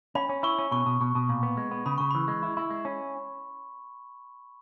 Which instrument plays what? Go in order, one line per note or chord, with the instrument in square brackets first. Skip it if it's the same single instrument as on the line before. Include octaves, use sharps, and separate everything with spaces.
[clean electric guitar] C#4 [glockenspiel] B5
[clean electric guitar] C#4
[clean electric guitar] E4 [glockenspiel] C#6
[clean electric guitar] C#4
[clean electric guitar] B2 [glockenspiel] C#6
[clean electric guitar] B2
B2
B2
A#2
B3
G#3
B3
[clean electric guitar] C#3 [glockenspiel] B5
[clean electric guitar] C#3 [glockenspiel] C#6
[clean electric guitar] E3 [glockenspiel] B5
[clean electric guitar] G#3
E4
E4
G#3
C#4